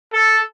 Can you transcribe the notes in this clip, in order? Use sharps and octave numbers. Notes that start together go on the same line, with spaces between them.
A4